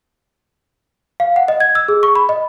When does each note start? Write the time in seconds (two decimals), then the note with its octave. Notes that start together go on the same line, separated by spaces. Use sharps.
1.20 F5
1.36 F#5
1.48 D#5
1.60 G#6
1.75 E6
1.88 G#4
2.03 C#6
2.15 B5
2.29 D#5